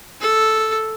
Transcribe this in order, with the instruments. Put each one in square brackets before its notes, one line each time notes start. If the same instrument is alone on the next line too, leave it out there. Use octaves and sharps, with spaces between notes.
[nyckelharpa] A4